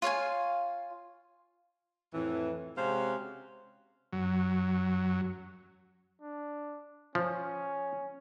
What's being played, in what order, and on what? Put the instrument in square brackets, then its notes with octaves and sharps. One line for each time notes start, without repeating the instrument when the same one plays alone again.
[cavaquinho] F4 C#5 F5 G#5
[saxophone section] F2 A2 E3
C3 G#3 C#4 F#4 C5 F5
[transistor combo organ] F#2 F#3
[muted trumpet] D4
[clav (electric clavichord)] F3 [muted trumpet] C#4